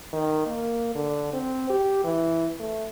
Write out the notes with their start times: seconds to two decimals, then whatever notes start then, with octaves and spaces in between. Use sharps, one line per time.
0.13 D#3
0.46 A#3
0.95 D3
1.33 C4
1.70 G4
2.04 E3
2.59 A3